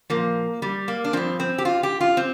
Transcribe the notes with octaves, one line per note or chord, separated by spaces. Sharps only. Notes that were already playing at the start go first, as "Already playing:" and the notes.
A#2 F3 A#3
G3
A#3
D4
G2 F3 C4
C4
G4
F4
G4
F4
C4